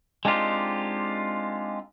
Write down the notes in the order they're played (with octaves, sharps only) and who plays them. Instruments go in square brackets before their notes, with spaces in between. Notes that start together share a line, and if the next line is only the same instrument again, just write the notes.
[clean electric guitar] G#3 C4 D4 D#4 F4 G4